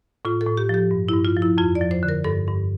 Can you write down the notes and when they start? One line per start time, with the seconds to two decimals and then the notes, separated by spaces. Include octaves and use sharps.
0.25 A2 F4
0.41 A4
0.46 A2
0.57 G4
0.69 F3 G4
0.91 G2
1.09 E4
1.13 G2
1.25 F4
1.37 F3
1.42 E4
1.58 F2 F4
1.75 D5
1.81 F3
1.91 C5
2.03 D3
2.09 A#4
2.24 G2 A4
2.48 G2